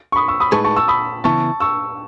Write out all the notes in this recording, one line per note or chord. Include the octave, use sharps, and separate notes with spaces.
C#6
B5 D#6
C#6 E6
B5 D#6
A2 G#3 D#4 G#4 B4 A5 C#6
A5 C#6
C#6 E6
B5 D#6
C#3 E3 B3 E4 A5 C#6
C#6 E6